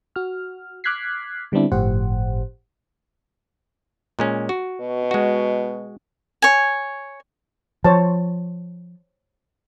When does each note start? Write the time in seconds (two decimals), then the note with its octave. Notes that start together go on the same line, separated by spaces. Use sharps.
0.16 F#4 F6
0.84 D6 F6 F#6 G#6 B6 C7
1.52 D3 G3 B3 C4 D4 E4
1.72 G1 A2 F3 G4 C5 F#5
4.19 A#2 G#3 C#4
4.49 F#4
4.81 B2
5.11 G#3 F#4
6.42 C#5 G#5
7.84 F3 C5 C#5 A5